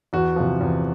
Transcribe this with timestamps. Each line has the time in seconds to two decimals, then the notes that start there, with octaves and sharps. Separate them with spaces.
0.13 E2 F#4
0.36 C3 F3
0.61 E2